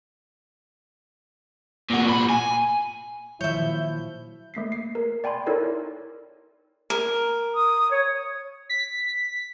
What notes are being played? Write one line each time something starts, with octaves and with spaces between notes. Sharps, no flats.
A#2 F#4
A#2 B5
G#5
A#2 D#3 F3 F#3 E4 C#5 E5 G6
A3 A#3 B6 C7
C7
A#4
D5 G5 G#5 B5 C6
D#4 E4 A4 A#4 C#5 D5
A#4
D#6
C#5
B6